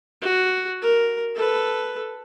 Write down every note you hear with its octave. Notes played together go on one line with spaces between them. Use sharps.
F#4
A#4
A4 B4